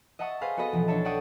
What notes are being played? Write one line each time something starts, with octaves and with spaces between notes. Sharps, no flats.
D#5 E5 F#5 A5 C#6 D#6
G#4 B4 C5 F5
B3 F#4 A4 B4 D#5
B1 E3 F3
D4 A4 C#5 E5 A5
D5 E5 F#5 G5 C#6 D#6